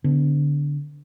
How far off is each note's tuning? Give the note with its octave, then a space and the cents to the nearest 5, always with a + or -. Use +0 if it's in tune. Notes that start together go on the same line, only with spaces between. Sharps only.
D3 -10 B3 +25